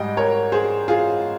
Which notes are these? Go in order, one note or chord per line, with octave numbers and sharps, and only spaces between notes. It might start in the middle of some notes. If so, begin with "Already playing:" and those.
Already playing: G#2 G3 D#5 G5
A#4 C#5
G#4 C5
F4 G#4